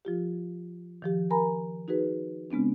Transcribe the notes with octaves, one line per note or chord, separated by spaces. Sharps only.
F3 F4 G4
D#3 F3 G4
A#4 G#5 A#5 B5
D#4 F#4 G#4 B4
C#3 G#3 B3 C4 D4